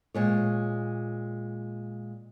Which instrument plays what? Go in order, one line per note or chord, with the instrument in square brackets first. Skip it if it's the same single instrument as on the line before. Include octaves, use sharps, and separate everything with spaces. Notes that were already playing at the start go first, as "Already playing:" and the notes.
[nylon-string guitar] A#2 G#3 C#5